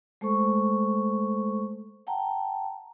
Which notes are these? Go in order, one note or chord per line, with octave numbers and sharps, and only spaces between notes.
G#3 A3 A4 C5 C#6
F#5 G5 A5 A#5